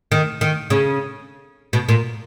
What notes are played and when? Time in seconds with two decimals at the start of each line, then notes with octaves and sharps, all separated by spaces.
0.12 D#3
0.41 D#3
0.70 C#3
1.73 B2
1.89 A#2